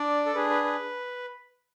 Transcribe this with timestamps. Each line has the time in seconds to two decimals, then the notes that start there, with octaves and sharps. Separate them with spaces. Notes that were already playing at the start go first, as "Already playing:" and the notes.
Already playing: D4 D5
0.26 A4
0.34 D4 G#4 B4
0.50 B4
0.64 B4